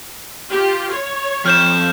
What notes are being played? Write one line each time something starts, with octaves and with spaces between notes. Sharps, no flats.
F4 G4
C#5
F2 F6 G6 E7